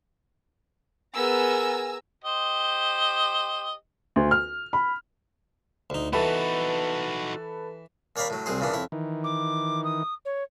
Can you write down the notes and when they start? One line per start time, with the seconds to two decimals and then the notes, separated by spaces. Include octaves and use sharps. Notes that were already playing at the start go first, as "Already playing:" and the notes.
1.15 B3 G#4 A#4 G#5 A#5 E6
2.24 G4 C5 D#5
4.16 D2
4.31 F6
4.73 B5
5.90 D2 D#4
6.13 E3 D#4 F#4 A4 B4
8.16 D#2 C#5 D5 F5 A#5 B5
8.30 A2 F#3
8.46 C2 F#3 G#4 C5
8.60 A#2 C#3 E3 B3 D4
8.73 F2 E4 C#5
8.92 D#3 E3
9.24 D6
9.84 D#6
10.25 C#5